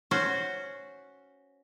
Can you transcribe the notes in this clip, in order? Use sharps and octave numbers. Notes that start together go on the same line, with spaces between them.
C#4 F#4 C5